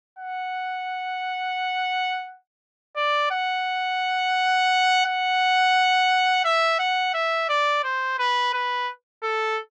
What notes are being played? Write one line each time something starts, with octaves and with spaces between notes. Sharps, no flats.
F#5
D5
F#5
F#5
E5
F#5
E5
D5
C5
B4
B4
A4